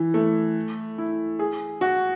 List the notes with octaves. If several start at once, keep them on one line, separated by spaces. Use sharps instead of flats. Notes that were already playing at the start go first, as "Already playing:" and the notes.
Already playing: E3
A3
E4
G#4
F#4